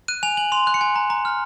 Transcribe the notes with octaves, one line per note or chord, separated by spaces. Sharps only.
F#6 D#7
G#5 F7
G#5 F#7
C6 F7
F#6
C#7
G#5
A#5
A#5
F6